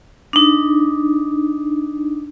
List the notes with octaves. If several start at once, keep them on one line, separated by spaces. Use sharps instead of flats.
D4 D#4